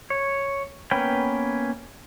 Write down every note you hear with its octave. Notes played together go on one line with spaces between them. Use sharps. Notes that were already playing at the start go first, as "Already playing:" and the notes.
C#5
A#3 B3 C#4 B4 G5